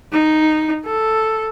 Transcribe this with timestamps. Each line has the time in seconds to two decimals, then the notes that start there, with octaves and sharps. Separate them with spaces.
0.12 D#4
0.86 A4